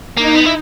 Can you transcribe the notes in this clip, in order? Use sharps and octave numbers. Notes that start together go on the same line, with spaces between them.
A#3 D#4
B3
E4